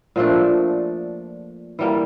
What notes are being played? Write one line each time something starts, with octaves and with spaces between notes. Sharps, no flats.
A#2 F3 A3 D4
E3 G3 A#3